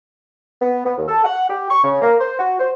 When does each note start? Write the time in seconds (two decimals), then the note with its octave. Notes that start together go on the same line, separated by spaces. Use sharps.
0.61 B3
0.85 B3
0.97 D#2
1.08 A4
1.24 F#5
1.49 G4
1.69 C#6
1.84 C#3
2.01 A#3
2.20 C5
2.39 F#4
2.59 C5